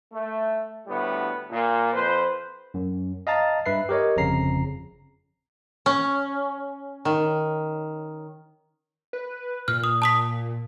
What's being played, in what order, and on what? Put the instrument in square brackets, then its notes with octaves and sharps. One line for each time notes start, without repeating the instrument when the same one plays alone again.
[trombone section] A3
D2 A2 G3 B3
A#2
F2 B4 C5
[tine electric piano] F#2
D#5 F5 A5 A#5 A6
G2 B4 E5 C7
G4 A#4 C#5 D#5
G1 F2 C#3 A#5 C7
[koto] C#4
D#3
[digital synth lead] B4
[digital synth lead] A#2 [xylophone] F6
[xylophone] D#6
A5 D#6 B6